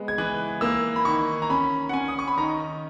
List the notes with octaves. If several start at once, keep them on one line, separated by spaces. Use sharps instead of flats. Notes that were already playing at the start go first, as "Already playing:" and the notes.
Already playing: G#3 B3
G#6
E3 F#6
A#3 E6
B5
D#3 C#6
A#5
C#4 B5
F#5
C#4 G#5
D#6
C#6
B5
D#3 A#5